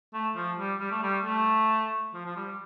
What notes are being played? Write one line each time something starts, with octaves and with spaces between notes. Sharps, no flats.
A3
F3
G3
G3
A3
G3
A3
F3
F3
G3